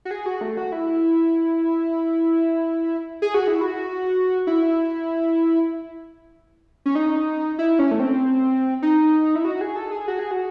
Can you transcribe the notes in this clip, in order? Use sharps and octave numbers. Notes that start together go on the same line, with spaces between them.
F#4
G#4
F#4
A3
F#4
E4
G#4
F#4
E4
F#4
E4
C#4
D#4
E4
C#4
A3
C4
D#4
E4
F#4
G#4
A4
G#4
F#4
G#4
F#4